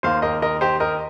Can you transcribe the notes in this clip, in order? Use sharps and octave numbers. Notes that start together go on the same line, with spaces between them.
D#2 D#3 A#3 C5 F5
A#4 D#5
A#4 D#5
G4 C5
A#4 D#5